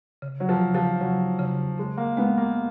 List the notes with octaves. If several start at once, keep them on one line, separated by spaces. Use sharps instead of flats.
C#3
F#3
F3
C#3
F3
C#3 F#3
C#3
C#3 G#3
A#3
G#3 B3
A#3